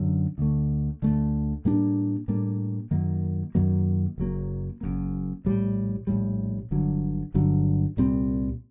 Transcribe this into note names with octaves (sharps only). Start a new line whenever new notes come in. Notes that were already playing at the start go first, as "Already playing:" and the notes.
Already playing: F#2 D3 F#3
D2 D3 A3
D2 D3 A3
A2 G3 A#3 D4
A2 G3 A#3 D4
F#2 D#3 F#3 A#3
F#2 D#3 F#3 A#3
F#1 F#2 F#3 A#3
F#1 F#2 F#3 A#3
A#1 A2 G3
A#1 A2 G3
G1 G2 D3 F#3
G1 G2 D3 F#3
C2 A#2 G3 C4